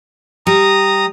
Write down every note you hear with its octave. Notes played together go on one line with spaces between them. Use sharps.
G3 A#5 D#6